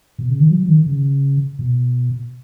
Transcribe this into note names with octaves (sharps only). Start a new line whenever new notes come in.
B2
C#3
D#3
F#3
D#3
C#3
B2